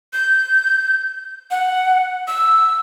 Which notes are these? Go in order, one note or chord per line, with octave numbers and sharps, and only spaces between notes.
G6
F#5
E6